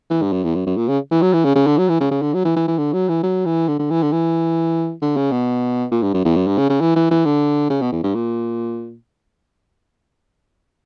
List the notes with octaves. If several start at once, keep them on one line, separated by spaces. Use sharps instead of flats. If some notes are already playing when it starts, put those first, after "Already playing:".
E3
G2
F#2
E2
F#2
F#2
A#2
C#3
E3
F#3
E3
C#3
C#3
D3
F#3
E3
C#3
C#3
D3
F#3
E3
E3
E3
D3
F#3
E3
F#3
E3
D3
D3
E3
D3
E3
D3
C#3
B2
A#2
G2
F#2
E2
F#2
G2
C#3
C#3
E3
E3
E3
D3
C#3
B2
E2
G2
A#2